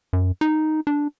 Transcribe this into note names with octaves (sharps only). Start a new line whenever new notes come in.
F#2
D#4
D4